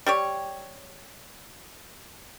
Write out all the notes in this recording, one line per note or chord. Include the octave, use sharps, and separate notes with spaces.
G3 G4 C#5